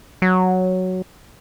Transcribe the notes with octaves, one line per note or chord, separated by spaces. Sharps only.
F#3